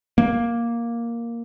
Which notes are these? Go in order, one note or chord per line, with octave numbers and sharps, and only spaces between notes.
A#3